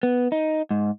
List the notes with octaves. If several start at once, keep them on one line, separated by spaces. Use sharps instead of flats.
B3
D#4
G#2